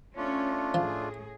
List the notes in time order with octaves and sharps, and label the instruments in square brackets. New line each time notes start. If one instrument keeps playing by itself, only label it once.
[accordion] A3 D4 F4 [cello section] C#4
[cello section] A2 G#4 [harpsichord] F3